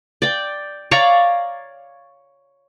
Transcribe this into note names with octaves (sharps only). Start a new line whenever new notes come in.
D5 G5
C#5 D5 F5 A#5